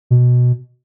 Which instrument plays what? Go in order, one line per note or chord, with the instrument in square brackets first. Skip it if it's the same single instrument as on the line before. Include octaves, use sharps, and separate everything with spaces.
[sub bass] B2